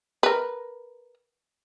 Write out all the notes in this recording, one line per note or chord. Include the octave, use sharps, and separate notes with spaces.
A#4 B4